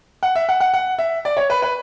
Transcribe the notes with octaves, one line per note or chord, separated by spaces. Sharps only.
F#5
E5
F#5
F#5
F#5
E5
D5
C#5
B4
B4